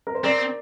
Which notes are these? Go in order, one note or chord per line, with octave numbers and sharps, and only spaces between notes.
A#4
C5
C4 A#4 D5